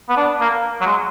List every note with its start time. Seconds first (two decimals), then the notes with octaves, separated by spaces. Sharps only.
0.09 B3
0.17 D4
0.41 A#3
0.81 F#3
0.86 G#3